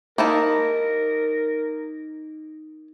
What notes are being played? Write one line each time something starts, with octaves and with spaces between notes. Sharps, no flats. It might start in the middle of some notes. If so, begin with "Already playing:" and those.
A#3 D#4 E4 A#4 A5